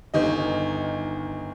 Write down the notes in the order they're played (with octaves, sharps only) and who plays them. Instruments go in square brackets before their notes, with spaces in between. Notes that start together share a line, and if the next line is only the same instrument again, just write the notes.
[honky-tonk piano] G1 D#3 D#5